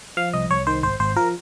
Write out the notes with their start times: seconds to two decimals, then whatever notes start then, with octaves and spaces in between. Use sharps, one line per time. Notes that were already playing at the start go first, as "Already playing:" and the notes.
0.17 F3 F5
0.34 C2 D#5
0.50 C2 C#5
0.67 D#3 C5
0.83 G#1 C5
1.00 G#1 C5
1.16 F3 A#4